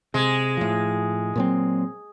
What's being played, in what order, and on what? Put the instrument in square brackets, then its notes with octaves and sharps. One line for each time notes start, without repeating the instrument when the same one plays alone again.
[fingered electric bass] C3 [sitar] G#3
[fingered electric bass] A2 F3
A#2 F#3 C4